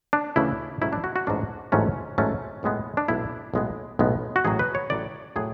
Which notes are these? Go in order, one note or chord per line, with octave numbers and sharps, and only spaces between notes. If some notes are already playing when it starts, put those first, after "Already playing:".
D4
D2 C#3 E3 A3 C#4 E4
A1 G#2 F#3 A3 C#4 E4
D4
F#4
F#4
A1 G#2 F#3 A3 C#4 D4
A1 G#2 F#3 A3 C#4
A1 G#2 F#3 A3 C#4
B1 A2 G#3 B3
D4
B1 A2 G#3 B3 E4
B1 A2 G#3 B3
B1 A2 G#3 B3
F#4
A1 A2 F#3 G#4
B4
C#5
A1 A2 F#3 D5
A2 F#3 G#4